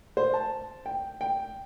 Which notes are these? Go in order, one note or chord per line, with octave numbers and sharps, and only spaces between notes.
C5
A5
G5
G5